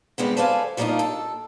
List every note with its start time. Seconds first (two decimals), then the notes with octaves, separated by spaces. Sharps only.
0.18 D#3 G3 G#3 B3 C4
0.37 A4 B4 C5 D5 F5 G#5
0.77 F3 G3 A#3 D4 D#4 F4
0.99 A4